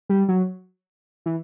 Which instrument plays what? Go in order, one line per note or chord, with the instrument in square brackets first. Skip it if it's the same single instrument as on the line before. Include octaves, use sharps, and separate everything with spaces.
[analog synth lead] G3
F#3
E3